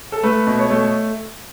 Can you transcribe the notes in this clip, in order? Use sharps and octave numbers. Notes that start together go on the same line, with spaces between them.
A4
A3 B4
B2
C#5
A3